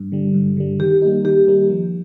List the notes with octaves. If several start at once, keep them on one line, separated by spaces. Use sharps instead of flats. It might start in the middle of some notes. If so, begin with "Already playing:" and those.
Already playing: G2
D3 G3
G2
D3 G3
D#3 G4
G3 A#3 D#4
D#3 G4
G3 A#3 D#4
F3